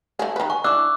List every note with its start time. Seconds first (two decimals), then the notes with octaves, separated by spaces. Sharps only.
0.19 A3 A#3 G#4
0.36 D#3 B4
0.50 G#5 C#6
0.64 D4 E4 D6 E6 F#6